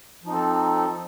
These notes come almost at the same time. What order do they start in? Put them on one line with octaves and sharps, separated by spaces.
F3 D#4 C4 A4